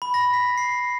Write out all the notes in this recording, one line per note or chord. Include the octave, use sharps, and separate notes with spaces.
B5
A#6
B6
C7
C7